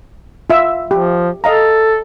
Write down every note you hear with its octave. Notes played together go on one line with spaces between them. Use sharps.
F4 E5 E6
F3 G4
A4 D#5 F5 A#5